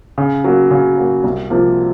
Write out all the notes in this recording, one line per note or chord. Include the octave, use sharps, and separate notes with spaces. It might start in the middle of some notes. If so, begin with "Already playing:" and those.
C#3
F#3 A#3
C#3
F#3 A#3
C2
C3 F3 A#3